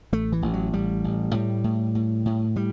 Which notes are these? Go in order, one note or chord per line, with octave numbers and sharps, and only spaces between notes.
A1 A3
E3
A1
F#3
A1 G3
A1
A2 G3
A2
A2
A2
A2 G3